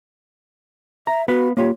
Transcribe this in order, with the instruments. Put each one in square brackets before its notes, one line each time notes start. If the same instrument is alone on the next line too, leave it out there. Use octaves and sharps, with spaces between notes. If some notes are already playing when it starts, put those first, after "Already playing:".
[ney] E5 [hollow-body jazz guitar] A#5
[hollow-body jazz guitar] B3 B4 F5 [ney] F#4
[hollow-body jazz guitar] A#3 F4 G4 [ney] C#5